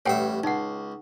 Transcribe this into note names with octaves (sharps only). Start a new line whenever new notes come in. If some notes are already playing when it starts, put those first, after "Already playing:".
A1 G2 C#5 E5 F#5 G5
C#2 D#4 F#5